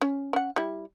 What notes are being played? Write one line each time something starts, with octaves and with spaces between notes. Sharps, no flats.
C#4
C#4 F#5
G3 E4